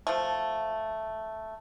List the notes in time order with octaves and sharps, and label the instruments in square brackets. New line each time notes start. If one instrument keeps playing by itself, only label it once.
[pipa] F3 A3